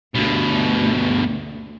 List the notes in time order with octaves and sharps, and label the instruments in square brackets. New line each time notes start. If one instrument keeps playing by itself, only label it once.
[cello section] D2 [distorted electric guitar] G2 B2